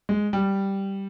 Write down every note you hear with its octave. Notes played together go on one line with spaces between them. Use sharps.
G#3
G3